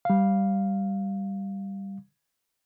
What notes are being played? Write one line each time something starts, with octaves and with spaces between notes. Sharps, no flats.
G3 F5